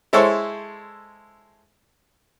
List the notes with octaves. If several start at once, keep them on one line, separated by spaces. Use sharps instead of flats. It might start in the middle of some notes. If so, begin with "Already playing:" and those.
G#3 E4 A4 C5 C#5